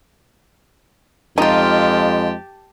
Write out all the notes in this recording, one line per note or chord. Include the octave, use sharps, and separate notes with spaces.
F2 G#3 D#4 F4 G4 A5